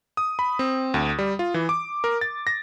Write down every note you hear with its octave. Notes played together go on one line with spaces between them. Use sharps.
D#6
B5
C4
D2
G3
F4
E3
D6
A#4
A6
A#6